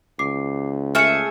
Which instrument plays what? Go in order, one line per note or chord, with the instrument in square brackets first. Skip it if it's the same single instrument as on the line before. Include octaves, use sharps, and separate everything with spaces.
[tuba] C#2 [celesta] D6 C7
[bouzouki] A3 G#4 E5 [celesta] F6 C#7